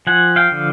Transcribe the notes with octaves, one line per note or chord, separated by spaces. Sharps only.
F3 F#5 G#5
F5 G5
D3